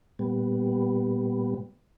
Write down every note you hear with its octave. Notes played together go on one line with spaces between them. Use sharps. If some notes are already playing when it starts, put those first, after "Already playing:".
A#2 G3 B3